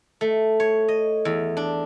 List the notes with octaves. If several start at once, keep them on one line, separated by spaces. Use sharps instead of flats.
A3
C#5
D#5
E2
D4